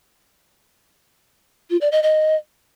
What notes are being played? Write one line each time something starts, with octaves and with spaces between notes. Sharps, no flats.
F4
D5
D#5
D#5